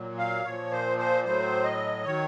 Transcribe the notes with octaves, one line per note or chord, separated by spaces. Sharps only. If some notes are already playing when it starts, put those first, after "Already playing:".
Already playing: A#2 F#3
F5
A#2 F3 C#5
C5
C5
A2 F#3 C5
D#5
D#3 F#3 C#5